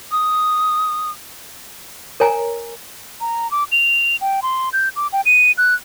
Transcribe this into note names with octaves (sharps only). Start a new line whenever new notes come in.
D#6
A#4 C#5 G#5 A#5
A#5
D6
F7
G5
C6
G6
D6
G5
D#7
F#6